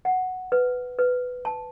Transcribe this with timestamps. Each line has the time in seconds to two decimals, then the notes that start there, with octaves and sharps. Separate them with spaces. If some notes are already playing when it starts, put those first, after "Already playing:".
0.05 F#5
0.52 B4
0.99 B4
1.45 A5